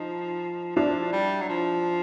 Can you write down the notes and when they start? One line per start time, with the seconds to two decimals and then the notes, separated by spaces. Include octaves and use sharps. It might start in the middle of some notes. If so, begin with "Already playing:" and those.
Already playing: F3 D#4
0.76 F3 D4 E4
1.12 G3
1.41 F#3
1.49 F3